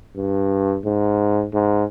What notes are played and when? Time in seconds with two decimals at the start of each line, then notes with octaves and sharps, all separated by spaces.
0.17 G2
0.85 G#2
1.54 G#2